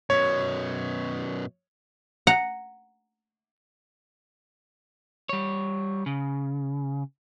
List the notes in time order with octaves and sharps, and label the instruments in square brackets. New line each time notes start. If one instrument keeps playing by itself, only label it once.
[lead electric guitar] F#2 B2 [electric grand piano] C#5
[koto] F#5 A#5
[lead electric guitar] G3 C#5
C#3